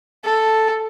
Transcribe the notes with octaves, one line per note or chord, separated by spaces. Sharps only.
A4